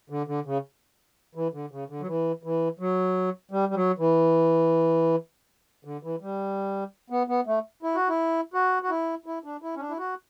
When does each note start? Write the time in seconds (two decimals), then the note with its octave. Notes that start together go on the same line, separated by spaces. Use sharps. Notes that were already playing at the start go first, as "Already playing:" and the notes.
0.10 D3
0.27 D3
0.45 C#3
1.35 E3
1.53 D3
1.71 C#3
1.89 D3
2.01 F#3
2.07 E3
2.43 E3
2.79 F#3
3.51 G3
3.69 G3
3.75 F#3
3.98 E3
5.85 D3
6.03 E3
6.21 G3
7.10 B3
7.28 B3
7.46 A3
7.83 E4
7.95 F#4
8.09 E4
8.54 F#4
8.82 F#4
8.90 E4
9.26 E4
9.44 D4
9.62 E4
9.76 C#4
9.80 D4
9.90 E4
9.98 F#4